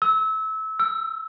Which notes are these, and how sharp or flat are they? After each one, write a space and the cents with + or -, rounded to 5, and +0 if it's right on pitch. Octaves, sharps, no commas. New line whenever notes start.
E6 -25
E6 +20